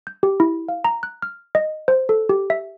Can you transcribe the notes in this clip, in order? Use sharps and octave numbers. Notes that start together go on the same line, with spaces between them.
G6
G4
E4
F5
A#5
F#6
F6
D#5
C5
A4
G4
E5